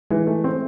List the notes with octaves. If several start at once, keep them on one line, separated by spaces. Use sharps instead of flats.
E3 G#3
A3
C4